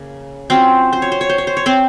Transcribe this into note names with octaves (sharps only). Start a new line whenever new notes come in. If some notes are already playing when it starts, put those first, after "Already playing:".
Already playing: C#3 A#3
F#3 C4 C#4 F4 C5
C5
C#5
C5
C#5
C5
C#5
C5
C#5
C4 C5